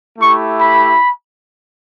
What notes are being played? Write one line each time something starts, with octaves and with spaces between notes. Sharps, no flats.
A3 E4 G4 C#6
B5